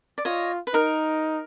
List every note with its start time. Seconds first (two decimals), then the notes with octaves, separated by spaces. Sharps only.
0.18 D5
0.25 F4 C#5 D#5
0.67 B4
0.74 D#4 A#4